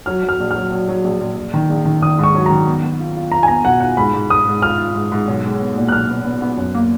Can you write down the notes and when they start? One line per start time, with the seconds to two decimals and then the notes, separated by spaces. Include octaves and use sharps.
0.06 F#3 F6
0.23 F#3
0.29 F6
0.40 A#1
0.51 F6
0.56 F#3
0.72 F#3
0.88 F#3
1.04 A#1
1.21 A#1
1.37 A#1
1.54 D#3
1.69 A#1
1.85 D#3
2.02 D#3 D#6
2.19 G#2 C#6
2.35 F#3
2.46 D#3 A#5
2.66 B3
2.84 B3
3.00 F4
3.16 F4
3.32 F4 A#5
3.43 G#5
3.48 B3 A#5
3.65 B2 F#5
3.80 F4 F#5
3.97 G#2 B5
4.14 G#2
4.30 G#2 D#6
4.47 G#2
4.62 F4 F6
4.78 F4
4.95 G#2
5.12 G#2
5.27 B1
5.44 G#3
5.60 B3
5.76 A#2
5.88 F#6
5.92 B1 F6
6.08 B3
6.24 B3
6.42 B3
6.57 F#2
6.75 A#3